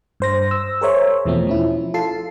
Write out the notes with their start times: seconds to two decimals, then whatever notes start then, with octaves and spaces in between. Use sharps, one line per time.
0.20 G2 C5 A#6
0.51 E6
0.81 G#4 A#4 C5 C#5 E5
1.25 E2 B2 F3 A3 C4
1.47 F3 C#4 E4
1.94 F4 A4 A5 C7